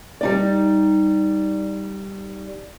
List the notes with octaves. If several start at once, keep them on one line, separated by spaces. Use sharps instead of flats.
G3 D#4 D5